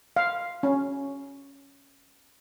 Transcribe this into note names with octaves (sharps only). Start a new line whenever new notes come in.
F5
C#4